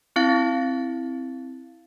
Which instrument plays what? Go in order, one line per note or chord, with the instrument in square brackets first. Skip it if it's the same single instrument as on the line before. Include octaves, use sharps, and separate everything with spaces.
[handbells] C4 E4 F5 A6